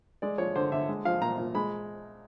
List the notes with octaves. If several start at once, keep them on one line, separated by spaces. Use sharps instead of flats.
G#3 D5
F3 C#5
D3 C5
D3 E5
G#3
F3 F5
A#2 A#5
A#2
G#3 B5